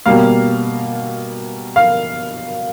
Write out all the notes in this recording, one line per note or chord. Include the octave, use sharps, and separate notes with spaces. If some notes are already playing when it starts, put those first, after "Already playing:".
B2 G3 A#3 F5
F5